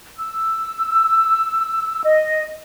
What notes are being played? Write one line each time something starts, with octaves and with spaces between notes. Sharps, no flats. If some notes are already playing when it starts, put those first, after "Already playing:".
E6
D#5